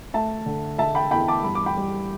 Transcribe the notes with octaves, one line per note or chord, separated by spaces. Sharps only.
A3 E5 A5
D3
D3 E5 A5
G5 B5
E2 G5 B5
A5 D6
G2 B5
D6
G5 B5
G3